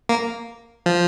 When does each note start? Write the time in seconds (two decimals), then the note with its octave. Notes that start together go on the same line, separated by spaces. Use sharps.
0.09 A#3
0.86 F3